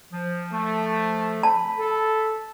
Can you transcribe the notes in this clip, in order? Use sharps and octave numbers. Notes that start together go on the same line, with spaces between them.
F3
A3
A5 B5
A4